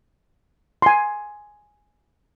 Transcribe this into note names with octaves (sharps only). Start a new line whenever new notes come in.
G#5 C6